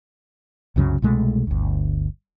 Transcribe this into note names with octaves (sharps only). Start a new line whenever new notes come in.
C2 F#2 C#3 F#3
C2 B2 G#3 A3
G1 D2